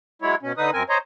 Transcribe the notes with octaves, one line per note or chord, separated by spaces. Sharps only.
F#3 G#3 E4 C#5
B2 C#4
D3 D#4 B4 D#6
F#2 C4 A#4 G#5
C5 C#5 D#5 A#5